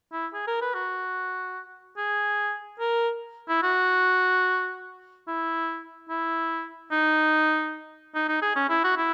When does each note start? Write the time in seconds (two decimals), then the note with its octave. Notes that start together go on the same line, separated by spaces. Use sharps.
0.12 E4
0.34 G#4
0.47 A#4
0.61 B4
0.74 F#4
1.97 G#4
2.80 A#4
3.48 E4
3.63 F#4
5.28 E4
6.09 E4
6.92 D#4
8.15 D#4
8.28 D#4
8.42 G#4
8.56 C#4
8.69 E4
8.84 F#4
8.97 E4